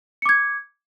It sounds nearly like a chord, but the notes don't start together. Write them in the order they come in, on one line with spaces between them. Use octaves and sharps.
C#7 D6 G#6